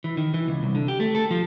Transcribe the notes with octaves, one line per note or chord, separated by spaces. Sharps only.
E3
D#3
E3
C#2
C2
D3
G4
A3
A4
F3